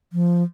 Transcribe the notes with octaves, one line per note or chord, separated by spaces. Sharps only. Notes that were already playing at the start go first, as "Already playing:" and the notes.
F3